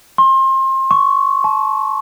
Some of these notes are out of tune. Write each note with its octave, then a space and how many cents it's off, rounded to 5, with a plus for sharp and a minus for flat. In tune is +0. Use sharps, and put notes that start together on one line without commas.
C6 +30
C#6 +10
A5 -30